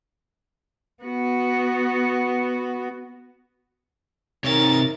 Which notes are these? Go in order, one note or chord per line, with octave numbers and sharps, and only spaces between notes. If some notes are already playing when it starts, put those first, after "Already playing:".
B3 F#4
C3 D#4 A#4 C#5 A6